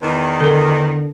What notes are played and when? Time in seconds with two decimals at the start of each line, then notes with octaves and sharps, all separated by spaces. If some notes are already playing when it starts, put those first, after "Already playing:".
0.03 E2 D#3
0.40 D3 A4 A#4